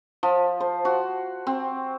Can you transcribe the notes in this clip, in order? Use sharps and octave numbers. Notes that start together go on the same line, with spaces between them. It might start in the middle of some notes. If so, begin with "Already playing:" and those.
F3
C5
F#4
C4